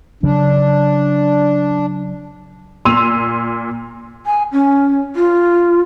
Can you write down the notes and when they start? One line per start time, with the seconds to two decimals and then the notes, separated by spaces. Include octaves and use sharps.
0.23 C#3 F#3 D4
2.85 A#2 C6 E6 D#7 F7
4.26 G#5
4.52 C#4
5.16 F4